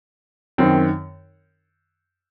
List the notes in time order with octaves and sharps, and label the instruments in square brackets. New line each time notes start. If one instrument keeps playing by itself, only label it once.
[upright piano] F#2 D#3 C4